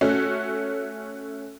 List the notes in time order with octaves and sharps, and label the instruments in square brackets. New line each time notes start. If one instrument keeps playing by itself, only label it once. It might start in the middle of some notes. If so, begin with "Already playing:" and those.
[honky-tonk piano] A3 C#4 F#4